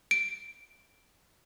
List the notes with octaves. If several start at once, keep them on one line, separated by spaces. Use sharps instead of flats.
D7